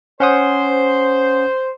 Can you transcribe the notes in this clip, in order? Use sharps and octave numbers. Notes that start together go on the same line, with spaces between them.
C#4 C5 F#5 D#6